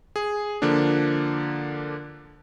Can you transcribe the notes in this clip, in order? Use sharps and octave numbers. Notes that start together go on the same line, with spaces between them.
G#4
D3 F3 A#3 D4